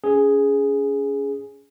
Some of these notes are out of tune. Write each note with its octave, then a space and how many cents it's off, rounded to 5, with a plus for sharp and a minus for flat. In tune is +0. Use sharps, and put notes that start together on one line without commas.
C#4 +25 G#4 +0